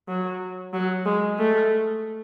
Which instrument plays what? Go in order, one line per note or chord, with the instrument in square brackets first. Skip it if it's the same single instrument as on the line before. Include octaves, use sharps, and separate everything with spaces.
[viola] F#3
F#3
G#3
A3